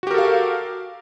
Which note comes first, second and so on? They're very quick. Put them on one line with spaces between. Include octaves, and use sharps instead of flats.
F#4 G4 A#4 A4 F5